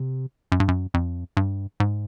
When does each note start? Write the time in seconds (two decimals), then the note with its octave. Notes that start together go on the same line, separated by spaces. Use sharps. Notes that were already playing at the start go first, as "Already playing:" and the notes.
Already playing: C3
0.52 F#2
0.60 G2
0.68 F#2
0.94 F2
1.37 G2
1.80 G#2